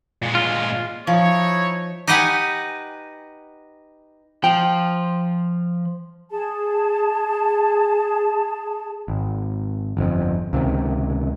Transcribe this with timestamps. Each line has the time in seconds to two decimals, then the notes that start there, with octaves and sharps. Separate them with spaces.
0.23 A#2 G#3
0.35 F4
1.07 F3 D#4 E4 C#5
2.07 D#4 G4 B4 D#5 F#5 G#5
4.44 F3 G5
6.31 G#4 A5
9.08 G#1
9.97 G1 F2
10.53 C#2 C3 D#3